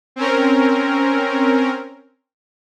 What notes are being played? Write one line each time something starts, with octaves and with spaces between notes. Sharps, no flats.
C4 C#4 A#4